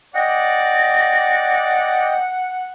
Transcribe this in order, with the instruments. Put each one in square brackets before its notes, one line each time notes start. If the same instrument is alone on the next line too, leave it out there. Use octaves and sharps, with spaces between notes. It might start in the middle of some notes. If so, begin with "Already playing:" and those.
[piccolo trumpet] D5 [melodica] D#5 G5 [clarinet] F#5 [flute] A#6